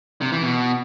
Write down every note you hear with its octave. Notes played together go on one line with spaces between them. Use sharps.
C3
E3
B2